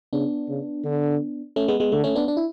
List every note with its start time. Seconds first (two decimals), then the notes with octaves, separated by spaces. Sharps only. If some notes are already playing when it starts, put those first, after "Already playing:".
0.13 C#3 B3 D4
0.49 C#3
0.84 D3
1.56 A3 C#4
1.68 G#3 B3
1.80 G#3 B3
1.92 D3 A3
2.04 A3 C#4
2.15 B3 D4
2.28 D4
2.37 E4